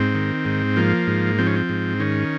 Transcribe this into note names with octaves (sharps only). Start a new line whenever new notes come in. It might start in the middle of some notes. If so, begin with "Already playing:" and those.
Already playing: G#2 C4
D#3
G#2
F3 A#3
G#2
F3 C4
C#4
C4
G#2
D#3 C#4